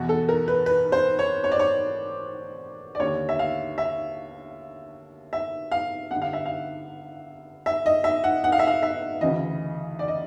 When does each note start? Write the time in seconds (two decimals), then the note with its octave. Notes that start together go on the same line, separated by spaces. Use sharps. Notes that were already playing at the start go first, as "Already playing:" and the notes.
Already playing: E2 B2 F#4
0.09 A4
0.29 A#4
0.48 B4
0.66 B4
0.92 C5
1.19 C#5
1.44 C#5
1.52 D5
1.59 C#5
2.95 D5
2.99 D#2 D3 C#5
3.29 E5
3.39 F5
3.78 E5
5.33 E5
5.72 F5
6.11 G2 D3 F#5
6.22 F5
6.33 E5
6.46 F5
7.66 E5
7.86 D#5
8.04 E5
8.24 F#5
8.44 F#5
8.52 F5
8.59 E5
8.68 F5
8.83 E5
9.21 D2 C#3 E3 D#5
9.99 D5
10.08 D#5